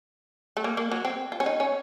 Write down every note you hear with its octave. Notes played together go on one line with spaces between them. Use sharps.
A3
A#3
A#3
F#3
C4
F4
C#4
D#4
C#4